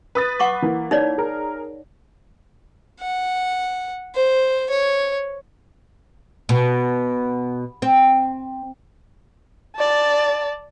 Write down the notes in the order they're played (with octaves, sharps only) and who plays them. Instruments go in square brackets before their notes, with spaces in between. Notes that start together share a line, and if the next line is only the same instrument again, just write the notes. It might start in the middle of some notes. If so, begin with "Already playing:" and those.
[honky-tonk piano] B4 D#6 A6
[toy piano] F#5 C#6 D6
[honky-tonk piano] E3 A#3
[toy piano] D#4 C#5 D5
[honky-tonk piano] G#4 A#4
[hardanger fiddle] F#5
C5
C#5
[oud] B2
C4
[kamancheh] D5 A5